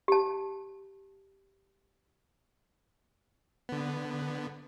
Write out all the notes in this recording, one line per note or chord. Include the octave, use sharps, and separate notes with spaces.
G4 A5
D3 B3